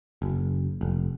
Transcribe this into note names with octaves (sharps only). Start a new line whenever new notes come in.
F#1
F1